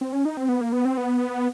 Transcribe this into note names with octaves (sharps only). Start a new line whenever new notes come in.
C4
C#4
D#4
C4
B3
A#3
B3
C4
B3